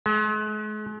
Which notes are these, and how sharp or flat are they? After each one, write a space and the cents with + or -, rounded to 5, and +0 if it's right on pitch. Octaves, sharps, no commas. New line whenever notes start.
G#3 +40